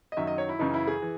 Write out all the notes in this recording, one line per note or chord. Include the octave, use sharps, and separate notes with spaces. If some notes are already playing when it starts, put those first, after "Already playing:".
D#5
F#2 D#3 F#3 E5
D#5
C#5
E4
F#2 C#3 E3 D#4
E4
G#4
E3